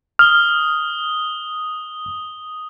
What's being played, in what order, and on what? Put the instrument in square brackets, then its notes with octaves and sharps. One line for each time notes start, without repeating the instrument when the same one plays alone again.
[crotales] D#6 G7 [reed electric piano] F6